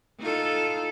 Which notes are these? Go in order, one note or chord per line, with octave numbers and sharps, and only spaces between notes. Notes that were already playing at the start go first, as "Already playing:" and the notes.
D#4 F4 A4